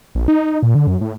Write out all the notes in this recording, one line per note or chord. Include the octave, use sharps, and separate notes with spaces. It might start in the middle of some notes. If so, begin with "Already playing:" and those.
A#1
D#4
D#4
A#2
D3
F#2
A2